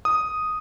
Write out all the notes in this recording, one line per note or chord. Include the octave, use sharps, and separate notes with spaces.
D#6